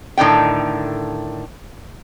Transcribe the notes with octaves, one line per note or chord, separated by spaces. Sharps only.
A2 D3 D#3 G5